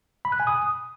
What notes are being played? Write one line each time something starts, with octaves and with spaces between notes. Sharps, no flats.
B5
F#6
G#5
D#6